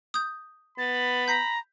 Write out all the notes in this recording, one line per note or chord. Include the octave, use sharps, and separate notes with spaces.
D#6 G6
B3 B5 A6
A#5 G6 B6 C7